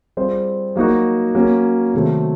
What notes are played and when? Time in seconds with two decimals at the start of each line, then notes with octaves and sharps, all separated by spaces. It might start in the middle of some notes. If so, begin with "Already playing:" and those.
0.17 G3 C4 F4 G#4 C5
0.76 F#3 A#3 D#4 F#4
1.35 F#3 A#3 C#4
1.94 C3 D#3 F#3 A3 C4